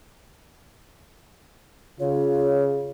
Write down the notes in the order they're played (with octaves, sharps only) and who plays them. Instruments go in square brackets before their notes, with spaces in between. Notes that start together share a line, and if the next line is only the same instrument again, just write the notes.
[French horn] C#3 [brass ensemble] F4 [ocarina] C#5